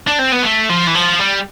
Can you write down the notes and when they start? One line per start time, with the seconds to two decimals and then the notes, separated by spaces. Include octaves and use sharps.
0.07 D4
0.19 C4
0.32 B3
0.43 A3
0.70 F3
0.87 E3
0.95 F3
1.20 G3